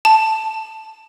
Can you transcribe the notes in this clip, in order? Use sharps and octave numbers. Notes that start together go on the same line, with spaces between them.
A5